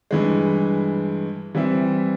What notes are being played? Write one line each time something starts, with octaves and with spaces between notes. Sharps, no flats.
G2 E3 G#3
E3 G3 C4 E4